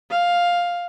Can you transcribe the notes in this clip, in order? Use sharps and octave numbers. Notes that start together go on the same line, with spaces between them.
F5